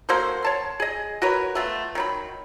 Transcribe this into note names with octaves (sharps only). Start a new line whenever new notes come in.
A#3 F#4 A4 C5
C#5 A5 C6
G#4 D#5
F#4 A#4 B4 C#5
A3 B3 F4
D#3 F#3 B5